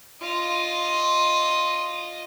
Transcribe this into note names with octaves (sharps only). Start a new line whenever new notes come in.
F4 D#5